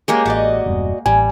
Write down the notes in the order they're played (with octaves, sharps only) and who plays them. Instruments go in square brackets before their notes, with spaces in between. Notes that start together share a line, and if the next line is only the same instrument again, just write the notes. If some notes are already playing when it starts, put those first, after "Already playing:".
[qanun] G#3 A#3 G4 [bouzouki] C#4
[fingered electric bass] A1 [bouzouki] F#4 D5 D#5
[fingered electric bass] E1 G2 B3
[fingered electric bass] A1 [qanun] G3 [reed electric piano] G#5